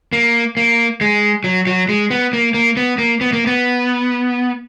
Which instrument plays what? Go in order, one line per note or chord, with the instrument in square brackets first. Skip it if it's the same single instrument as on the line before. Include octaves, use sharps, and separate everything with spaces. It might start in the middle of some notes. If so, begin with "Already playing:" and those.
[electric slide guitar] A#3
A#3
G#3
F#3
F#3
G#3
B3
A#3
A#3
B3
A#3
B3
A#3
B3